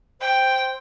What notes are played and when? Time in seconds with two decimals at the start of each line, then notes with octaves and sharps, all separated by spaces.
0.21 C5 G5